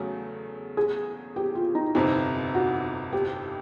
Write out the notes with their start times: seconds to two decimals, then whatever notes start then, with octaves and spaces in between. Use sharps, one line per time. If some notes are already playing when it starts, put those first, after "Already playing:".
Already playing: E2 C#3 F#3 A3 A4
0.77 G#4
1.36 G4
1.55 F4
1.75 D#4
1.95 G1 F2 C3 D#4
2.54 F#4
3.13 G4